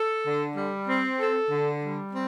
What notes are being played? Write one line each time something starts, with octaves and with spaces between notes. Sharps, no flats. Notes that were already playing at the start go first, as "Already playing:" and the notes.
Already playing: A4
D3
G3
C4
A4
D3
G3
C4